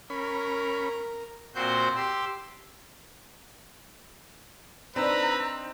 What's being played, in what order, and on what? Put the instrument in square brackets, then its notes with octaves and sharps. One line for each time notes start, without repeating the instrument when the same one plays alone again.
[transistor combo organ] C#4 B5 [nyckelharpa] A#4 A#5
[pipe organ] A#2 C4 F#4 C5 C6 G6
G4 C6 E6
[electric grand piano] C4 D#4 E6 [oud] D4 [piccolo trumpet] B4 [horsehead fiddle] A#5